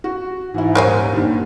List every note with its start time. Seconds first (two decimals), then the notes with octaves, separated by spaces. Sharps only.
0.04 F#4
0.54 G#2 E3 E4
0.75 D#1 A#4 C5 C#5 G#5 D#7
1.13 G2 A#2 D#3